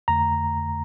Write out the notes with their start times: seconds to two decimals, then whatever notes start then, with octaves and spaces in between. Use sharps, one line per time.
0.08 F2 D3 A3 A#5